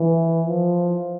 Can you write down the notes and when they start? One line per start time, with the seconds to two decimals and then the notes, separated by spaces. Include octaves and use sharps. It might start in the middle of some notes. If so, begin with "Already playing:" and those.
Already playing: E3
0.47 F3